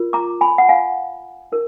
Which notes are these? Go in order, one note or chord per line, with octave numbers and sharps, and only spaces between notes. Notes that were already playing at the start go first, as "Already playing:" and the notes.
Already playing: F4 A#4
A#5 D6
G#5 B5
F#5
F5 G#5
D#4 A#4